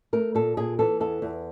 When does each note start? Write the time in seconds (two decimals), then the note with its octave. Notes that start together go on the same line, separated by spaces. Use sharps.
0.13 A3 A#4
0.35 A#2 A4
0.57 A#2 G#4
0.79 E3 A4
1.00 E2 A4
1.22 E2